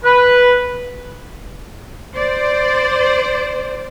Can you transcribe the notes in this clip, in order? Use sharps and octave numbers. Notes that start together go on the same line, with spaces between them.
B4
C5 D5